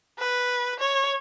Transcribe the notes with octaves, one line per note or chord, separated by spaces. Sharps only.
B4
C#5